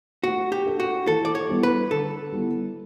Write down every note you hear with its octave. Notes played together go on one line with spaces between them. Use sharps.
A3 F#4
G4
D4 A4
F#4
E3 A4
D5
C#5
G3 B3 E4
B4
D3 A4
G3 B3 E4